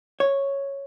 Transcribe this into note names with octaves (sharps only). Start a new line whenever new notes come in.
C#5